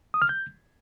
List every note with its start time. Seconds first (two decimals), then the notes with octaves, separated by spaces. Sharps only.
0.14 D#6
0.22 F6
0.29 G6